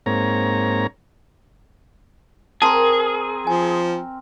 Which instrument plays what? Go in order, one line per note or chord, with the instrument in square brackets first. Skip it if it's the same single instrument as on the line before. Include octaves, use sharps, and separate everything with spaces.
[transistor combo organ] G#2 A#3 C4 C#5 A#5
[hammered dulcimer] C4 A#4 [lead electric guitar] G#4 [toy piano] A5 C6
[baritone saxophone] F3 [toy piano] G#5